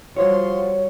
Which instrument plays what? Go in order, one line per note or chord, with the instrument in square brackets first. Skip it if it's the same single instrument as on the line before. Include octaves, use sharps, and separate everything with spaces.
[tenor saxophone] F3 [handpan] G3 F#4 [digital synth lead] C#5 [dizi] C6